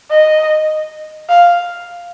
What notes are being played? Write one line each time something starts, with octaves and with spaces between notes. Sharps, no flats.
D#5
F5